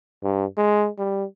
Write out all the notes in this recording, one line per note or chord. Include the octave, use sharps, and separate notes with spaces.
G2
G#3
G3